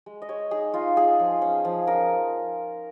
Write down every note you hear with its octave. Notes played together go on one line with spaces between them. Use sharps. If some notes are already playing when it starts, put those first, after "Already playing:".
G#3
D#5
G#3 C#5
D#4 G#4
D#4 F4
F4 G#4
F3
C#4
F3
C#4 A#4